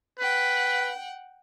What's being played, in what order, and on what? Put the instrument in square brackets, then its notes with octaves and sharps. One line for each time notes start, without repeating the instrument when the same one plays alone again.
[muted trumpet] B4 [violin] F#5 G5